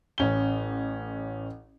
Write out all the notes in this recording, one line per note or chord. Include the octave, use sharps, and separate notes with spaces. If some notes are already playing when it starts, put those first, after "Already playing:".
A1 C#4 G7